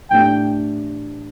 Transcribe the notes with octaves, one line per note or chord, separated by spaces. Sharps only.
A2 E3 A3 D4 G4 G5